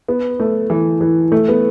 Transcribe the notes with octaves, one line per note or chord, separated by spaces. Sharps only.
B3
A3
E3
E3
A3
B3